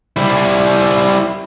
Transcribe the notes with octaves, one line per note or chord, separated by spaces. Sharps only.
G3 E4